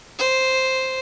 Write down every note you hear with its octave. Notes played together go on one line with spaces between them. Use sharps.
C5